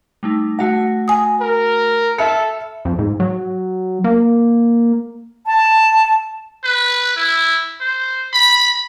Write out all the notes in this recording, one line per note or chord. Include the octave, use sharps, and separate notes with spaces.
G3 A3 D#4
A3 F#4 F#5 A#6
G#5 D#6
A#4
A4 E5 B5 F6 C#7
F2
G#2
F#3
A#3
A5
B4
E4
C5
B5